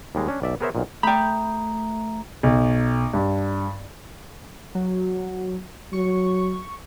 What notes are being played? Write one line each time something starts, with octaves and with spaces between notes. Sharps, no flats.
D#2 G3 G#3
C#4 D4
B1 D5 E5
B3 G#4 A#4 C5 C#5 E5
B1 A#2
A3 G5 A#5 B5
B1
G2
F#3
F#3 C#6